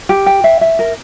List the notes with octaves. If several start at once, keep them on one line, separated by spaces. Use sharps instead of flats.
G4
G5
E5
E5
A#4